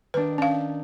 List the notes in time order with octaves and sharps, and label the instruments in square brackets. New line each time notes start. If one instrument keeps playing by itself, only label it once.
[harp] D#3 D4 [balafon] B4
[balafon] C#4 F5